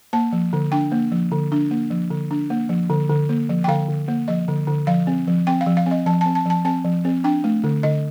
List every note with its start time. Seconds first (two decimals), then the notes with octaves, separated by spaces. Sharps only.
0.13 A#3 A5
0.33 F3
0.53 D3
0.72 D4 G5
0.92 A#3
1.12 F3
1.32 D3
1.52 D4
1.71 A#3
1.90 F3
2.10 D3
2.31 D4
2.50 A#3
2.69 F3
2.90 D3
3.10 D3
3.29 A#3
3.49 F3
3.64 G5
3.69 D3 F5
3.88 D3
4.08 A#3
4.28 F3 D#5
4.48 D3
4.67 D3
4.87 F3 F5
5.07 C4
5.28 F3
5.47 C4 G5
5.61 F5
5.66 F3
5.77 F5
5.86 C4
5.91 D#5
6.06 F3 A5
6.21 C4 A5
6.35 A5
6.46 F3 A5
6.65 C4 A5
6.84 F3
7.05 C4
7.24 D4 G5
7.44 A3
7.64 D3
7.83 D3 D#5